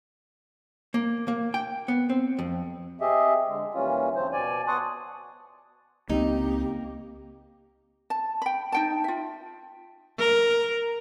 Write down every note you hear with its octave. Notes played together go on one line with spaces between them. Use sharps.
A#3
A#3
G5
B3
C4
F2
C4 G4 G#4 D#5 E5
D3 G#3
D#2 E3 G3 C#4 F4
C#3 F3 C4 C5
B2 D5 G#5
B3 A5 C6 C#6 D#6 F#6
C#2 G3 A#3 C4 D#4 G4
A5
G5 B5
D#4 G5 A5
F4 E5
A#4